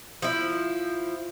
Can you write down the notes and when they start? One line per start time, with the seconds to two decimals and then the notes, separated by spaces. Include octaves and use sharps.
0.22 F3 E4